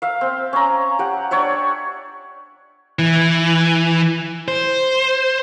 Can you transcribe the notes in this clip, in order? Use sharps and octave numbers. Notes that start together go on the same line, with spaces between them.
E5 F5
C4
C#4 A#5
G4 F#5
D4 C#5 D5 E5
E3
C5